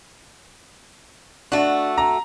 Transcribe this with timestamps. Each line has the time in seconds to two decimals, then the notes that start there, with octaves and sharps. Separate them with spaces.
1.52 A3 D4 F#4
1.98 A#5